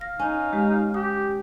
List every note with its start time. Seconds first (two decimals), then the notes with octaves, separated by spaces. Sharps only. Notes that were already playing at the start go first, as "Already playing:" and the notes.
0.01 F5 A#6
0.19 C#4 D#4
0.53 G#3 G4
0.94 G4 D#6